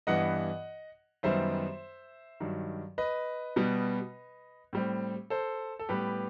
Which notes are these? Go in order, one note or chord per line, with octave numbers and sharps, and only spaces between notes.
G2 E3 B3 D#5 F#5
F#2 D#3 G3 B3 C5 E5
G2 D#3 F#3
B4 D#5
B2 G3 B3
A2 G3 C4
A4 C5
A4
A2 G3 B3 G4 B4